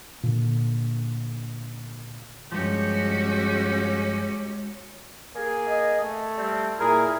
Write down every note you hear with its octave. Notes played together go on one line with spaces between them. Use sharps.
A#2 D3
G2 F3 G#3 C#4 F#4 G4
A#3 G#4 G#5
D#5
A3
G3 C4
A#2 E4 G#4 A#4